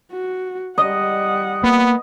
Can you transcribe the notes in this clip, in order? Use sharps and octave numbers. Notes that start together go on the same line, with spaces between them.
F#4
G3 D#5 F#5
A#3 B3